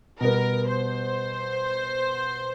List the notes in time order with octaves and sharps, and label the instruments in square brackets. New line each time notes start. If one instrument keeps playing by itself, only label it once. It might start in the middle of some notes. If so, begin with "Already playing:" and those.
[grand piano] B2 G3 B3 [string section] A#4
[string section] C5